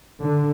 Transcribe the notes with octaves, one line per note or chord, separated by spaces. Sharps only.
D3